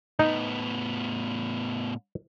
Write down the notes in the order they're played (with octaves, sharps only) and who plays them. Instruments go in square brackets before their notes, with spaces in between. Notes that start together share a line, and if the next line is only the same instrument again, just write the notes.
[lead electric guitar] A2 B3 [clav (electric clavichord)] D#4